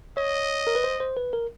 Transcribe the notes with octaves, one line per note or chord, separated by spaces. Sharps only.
C#5 D#5
A#4
B4
C5
C5
B4
A#4